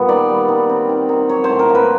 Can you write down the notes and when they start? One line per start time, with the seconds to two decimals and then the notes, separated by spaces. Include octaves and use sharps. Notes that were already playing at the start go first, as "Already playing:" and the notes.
Already playing: A#2 G3 B3
0.09 D#3 D5
0.29 G3
0.48 D#3
0.69 C4
0.89 D#3
1.09 D#3
1.29 F#3 C#5
1.44 A2 C5
1.59 A#4
1.70 A#3
1.75 B4